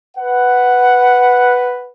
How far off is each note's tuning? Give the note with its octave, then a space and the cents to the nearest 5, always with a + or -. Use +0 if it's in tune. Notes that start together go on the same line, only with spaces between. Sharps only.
B4 +0 F#5 +0